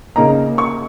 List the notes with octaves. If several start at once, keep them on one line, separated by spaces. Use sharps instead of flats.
C#3 A#3 D#4 A#5
C#6